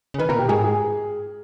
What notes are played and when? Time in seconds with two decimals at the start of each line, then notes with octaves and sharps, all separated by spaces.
0.14 C#3
0.18 D#3 B4
0.29 B2 A#4
0.34 A#2
0.39 G4
0.48 G#2 G#4
0.64 G#4